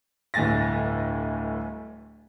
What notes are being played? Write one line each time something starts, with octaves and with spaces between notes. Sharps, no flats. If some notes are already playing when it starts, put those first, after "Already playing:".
D1 G1 A2 G#5 A6 A#6